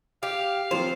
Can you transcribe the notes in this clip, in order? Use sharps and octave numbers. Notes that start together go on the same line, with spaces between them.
G4 F5
F3 F#3 C4 C5